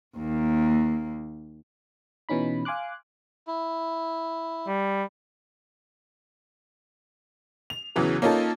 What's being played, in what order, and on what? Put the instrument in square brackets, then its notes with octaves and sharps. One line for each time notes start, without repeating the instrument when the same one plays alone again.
[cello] D#2 A#3
[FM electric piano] B2 E3 C#4 D#4 B5
F5 G#5 C6 D6 F#6
[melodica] E4
[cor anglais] G3
[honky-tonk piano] F7
E2 C#3 E3 F#3
A#3 C#4 D#4 F4 A4